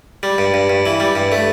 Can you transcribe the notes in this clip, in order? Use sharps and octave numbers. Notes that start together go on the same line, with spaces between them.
G3
G2
G2
G2
E3
G3
G2
A3